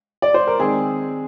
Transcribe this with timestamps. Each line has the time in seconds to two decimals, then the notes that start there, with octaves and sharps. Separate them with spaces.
0.22 D5
0.34 C5
0.47 A#4
0.59 D#3 G#3 C4 G#4